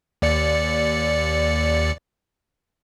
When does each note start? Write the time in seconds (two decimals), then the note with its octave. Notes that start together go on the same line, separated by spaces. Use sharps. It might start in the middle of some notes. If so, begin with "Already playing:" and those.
0.22 D#2 D5 C#7